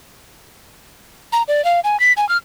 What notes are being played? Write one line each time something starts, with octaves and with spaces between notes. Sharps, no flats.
A#5
D5
F5
G#5
B6
G#5
F6